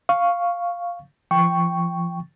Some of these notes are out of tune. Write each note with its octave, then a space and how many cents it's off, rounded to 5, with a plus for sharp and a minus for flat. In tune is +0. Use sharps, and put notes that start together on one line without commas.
F5 +0 C#6 +0
F3 -30 G5 +0 C#6 +0